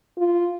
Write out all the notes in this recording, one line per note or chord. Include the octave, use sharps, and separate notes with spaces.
F4